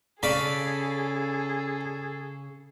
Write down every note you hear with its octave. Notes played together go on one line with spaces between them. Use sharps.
C#3 G#4 A4 D5 F5 B5